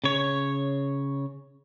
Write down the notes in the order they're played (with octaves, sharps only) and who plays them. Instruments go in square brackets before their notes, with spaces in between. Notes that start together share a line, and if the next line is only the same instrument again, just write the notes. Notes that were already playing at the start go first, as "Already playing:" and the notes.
[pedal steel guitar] C#3 C#5